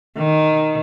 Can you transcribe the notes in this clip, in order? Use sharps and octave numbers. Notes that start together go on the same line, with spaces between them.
D#3